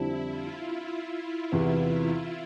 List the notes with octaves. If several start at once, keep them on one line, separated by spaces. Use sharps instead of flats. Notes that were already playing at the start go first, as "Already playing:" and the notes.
Already playing: F2 D3 G3 D4 E4
F4
E4
E2 C3 E3 B3